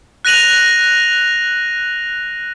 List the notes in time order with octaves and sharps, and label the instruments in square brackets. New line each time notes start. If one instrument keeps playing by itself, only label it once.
[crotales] F#6 A#6 D#7 F7 F#7